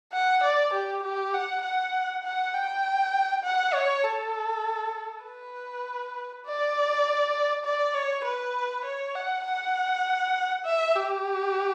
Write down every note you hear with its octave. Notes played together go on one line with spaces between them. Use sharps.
F#5
D5
G4
G4
F#5
F#5
F#5
G5
F#5
C#5
A4
B4
D5
D5
C#5
B4
C#5
F#5
F#5
E5
G4